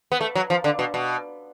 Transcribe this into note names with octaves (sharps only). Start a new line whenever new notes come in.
B3
A3
F#3
F3
D3
B2
B2